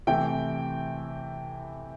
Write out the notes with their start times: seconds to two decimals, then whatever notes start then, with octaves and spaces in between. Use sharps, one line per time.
0.07 C3 E3 A3 E4 G5